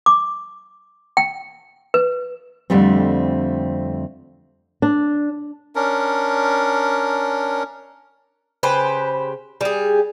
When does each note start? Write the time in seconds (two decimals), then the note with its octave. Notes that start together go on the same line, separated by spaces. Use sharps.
0.06 D6
1.17 G5
1.94 B4
2.70 F2 D3 G3 A3 C4
4.82 D4
5.75 C#4 D4 A#4
8.63 C#3 G4 B4 C5
9.61 G3 G#4